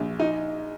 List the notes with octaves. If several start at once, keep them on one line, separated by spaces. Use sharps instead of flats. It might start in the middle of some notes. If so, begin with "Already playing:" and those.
Already playing: A#1
D#4